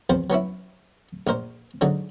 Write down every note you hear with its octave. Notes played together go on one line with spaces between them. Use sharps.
E2 F3 C4 C5
F#3 B3 C#4 E4
A#1 A#2 A#4 C5
G#2 D3 F#3 D4